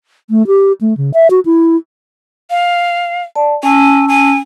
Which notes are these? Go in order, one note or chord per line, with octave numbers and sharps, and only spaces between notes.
A3
G4
A3
C#3
E5
F#4
E4
F5
D5 A5
C#4 G#5 A5 E6
G#5